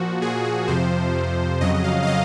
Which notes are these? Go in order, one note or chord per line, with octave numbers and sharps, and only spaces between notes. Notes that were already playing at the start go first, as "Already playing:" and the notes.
Already playing: A#2 F3 F#4
A#2 F3 G#4
G#4
F2 C3 F3 C5
F2 C3 F3
F2 C#3 F#3 D#5
D#5
F5
F5
C#3 F#3 D#5